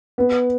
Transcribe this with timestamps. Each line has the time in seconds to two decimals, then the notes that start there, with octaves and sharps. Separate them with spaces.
0.18 B3